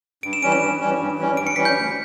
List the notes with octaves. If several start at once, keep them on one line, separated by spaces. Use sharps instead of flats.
G2 D7
E7
E3 G3 C#4 D7
E7
G2
E3 G3 C#4
G2
E3 G3 C#4
G2 D7
C#7
E3 G3 C#4 B6
G6
D2